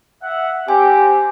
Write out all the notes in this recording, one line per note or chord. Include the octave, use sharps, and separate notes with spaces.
E5 F#5
C4 G4 G#5